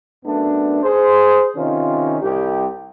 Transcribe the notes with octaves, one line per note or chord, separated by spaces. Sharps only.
F#2 A3 B3 D4
G#4 C5
C3 D#3 C#4 D#4 F4
C2 G4